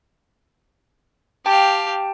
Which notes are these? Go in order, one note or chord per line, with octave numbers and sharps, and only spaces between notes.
G4 F5 G5 A5